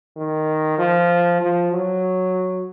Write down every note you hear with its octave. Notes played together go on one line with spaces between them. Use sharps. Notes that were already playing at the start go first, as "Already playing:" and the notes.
D#3
F3
F3
F#3